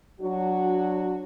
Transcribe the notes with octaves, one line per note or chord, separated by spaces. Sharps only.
F#3 D4 F#4